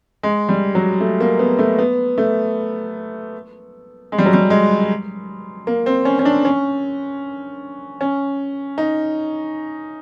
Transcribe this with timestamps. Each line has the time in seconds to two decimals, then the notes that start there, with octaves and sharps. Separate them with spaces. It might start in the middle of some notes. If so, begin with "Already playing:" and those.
0.23 G#3
0.49 G3
0.75 F#3
1.00 A3
1.20 A#3
1.39 B3
1.59 A3
1.78 B3
2.18 A3
4.12 G#3
4.18 G3
4.26 F#3
4.33 G3
4.50 G#3
5.67 A#3
5.86 C4
6.05 C#4
6.19 C#4
6.25 D4
6.45 C#4
8.01 C#4
8.78 D#4